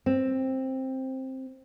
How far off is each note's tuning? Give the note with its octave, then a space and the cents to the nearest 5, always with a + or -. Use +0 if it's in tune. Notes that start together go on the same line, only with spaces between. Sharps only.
C4 +10